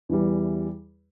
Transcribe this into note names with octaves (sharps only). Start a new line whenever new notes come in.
E2 E3 G3